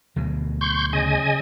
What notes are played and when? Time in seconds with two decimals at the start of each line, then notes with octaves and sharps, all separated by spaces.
0.16 D2 B2 F#3
0.61 C6 C#6 G6
0.93 C#3 D#5 G#5